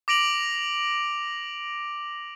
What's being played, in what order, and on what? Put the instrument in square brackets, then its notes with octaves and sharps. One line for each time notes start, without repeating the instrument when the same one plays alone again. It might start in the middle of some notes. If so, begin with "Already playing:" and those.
[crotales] D6 A#6 D7 F7 F#7